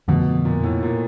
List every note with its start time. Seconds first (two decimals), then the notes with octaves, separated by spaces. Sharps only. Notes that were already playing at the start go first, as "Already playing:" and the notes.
0.08 F2 B2 D3 F3 A3
0.45 A#2
0.64 A2
0.83 A#2